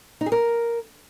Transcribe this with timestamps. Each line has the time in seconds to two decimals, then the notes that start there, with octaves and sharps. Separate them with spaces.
0.21 D#4
0.26 G#4
0.32 A#4